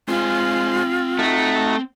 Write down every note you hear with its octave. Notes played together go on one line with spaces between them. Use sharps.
G#3 C4 F4 C5 G#5
A3 D#4 F#4 A#5